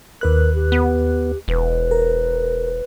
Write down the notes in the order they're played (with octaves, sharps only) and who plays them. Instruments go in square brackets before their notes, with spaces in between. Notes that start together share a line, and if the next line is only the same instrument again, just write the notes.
[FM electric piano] D#2 B4 F#6 [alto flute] A#4
[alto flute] G4
[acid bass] B3
[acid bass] E1 [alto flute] B4
[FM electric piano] A#4